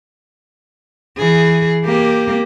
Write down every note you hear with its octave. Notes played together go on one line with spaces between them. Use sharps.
E3 G#4
A#3 G4